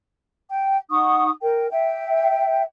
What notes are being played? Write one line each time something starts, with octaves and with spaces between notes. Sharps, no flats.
G5
D#4 F#5 C#6 D#6
A#4 G5
E5 G5